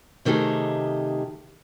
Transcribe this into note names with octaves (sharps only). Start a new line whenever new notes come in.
C3 D#3 A3 D#4 G4 G#4